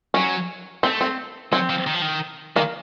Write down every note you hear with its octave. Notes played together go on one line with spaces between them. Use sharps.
F#3 C#4
A3 C4
C4
F#3 C4
F3
D#3
F3
D#3
D#3 A#3